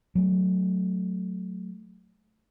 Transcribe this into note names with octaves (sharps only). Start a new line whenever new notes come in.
F#3 A3